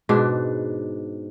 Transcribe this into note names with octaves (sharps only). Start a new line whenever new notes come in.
G#2 B2 D4